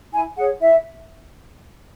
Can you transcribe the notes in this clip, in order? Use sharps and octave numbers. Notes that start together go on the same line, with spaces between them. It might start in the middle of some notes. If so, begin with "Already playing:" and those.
E4 G#5
G#4 C#5 F#5
E4 E5